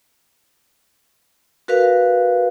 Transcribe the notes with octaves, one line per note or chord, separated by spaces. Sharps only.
F#4 A#4 B4 F5